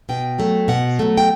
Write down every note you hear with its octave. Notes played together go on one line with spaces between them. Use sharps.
B2 G5
F#3 A3
B2 F#5
F#3 A3
G5